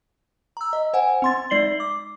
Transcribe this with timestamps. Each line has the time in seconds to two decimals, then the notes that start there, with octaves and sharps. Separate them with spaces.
0.57 A#5 E6
0.73 D#5
0.94 C5 F#5 G#5
1.22 C4 C6 A6
1.50 G#3 D#4 D5 C7 F#7 G7
1.80 D6